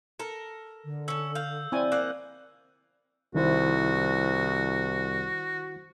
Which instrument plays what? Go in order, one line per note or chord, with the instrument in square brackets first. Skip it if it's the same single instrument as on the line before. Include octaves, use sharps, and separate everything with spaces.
[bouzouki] A4 A#4
[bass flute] D3
[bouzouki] C#4 A4 [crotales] E6
[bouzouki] F5 [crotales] G6
[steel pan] C4 E4 G#5 [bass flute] D5
[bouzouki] A#3 F5 F#5
[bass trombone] C2 [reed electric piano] D#3 E4 C5 [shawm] F#4